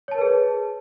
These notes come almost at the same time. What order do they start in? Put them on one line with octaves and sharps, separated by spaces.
C#5 A5 A#4 B4 G#4